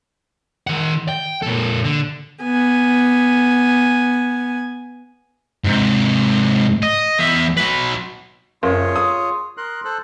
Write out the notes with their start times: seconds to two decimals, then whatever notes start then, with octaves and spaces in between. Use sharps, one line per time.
0.67 D#3 F#5
1.09 G5
1.42 A#2 A4
1.84 D3
2.43 B3 G#5
5.64 G#2 C3
6.83 D#5
7.19 E2 E5
7.57 F#3 B4
8.63 F#1 F4 G#4 C#5
8.96 D#6
9.57 A#4 C6 F#6
9.85 A4 C5 F#6